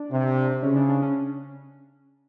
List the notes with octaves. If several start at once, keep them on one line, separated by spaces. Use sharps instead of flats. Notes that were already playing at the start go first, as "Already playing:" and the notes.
Already playing: D4
C3
C#3 C#4
D4
D4
C#4